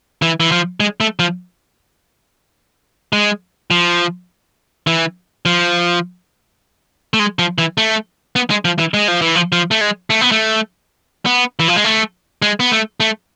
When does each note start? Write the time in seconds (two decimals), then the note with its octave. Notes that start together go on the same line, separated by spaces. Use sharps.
0.22 E3
0.40 E3
0.52 F3
0.80 G#3
1.00 A3
1.19 F3
3.13 G#3
3.71 F3
4.87 E3
5.46 F3
7.14 A3
7.19 G#3
7.39 F3
7.58 E3
7.78 A3
8.36 B3
8.50 G#3
8.65 F3
8.79 E3
8.94 G#3
9.08 F3
9.22 E3
9.36 F3
9.52 F3
9.71 A3
9.81 G#3
10.10 A3
10.21 B3
10.32 A3
11.26 B3
11.59 E3
11.68 F3
11.76 G#3
11.84 A3
12.42 G#3
12.60 B3
12.71 A3
13.00 A3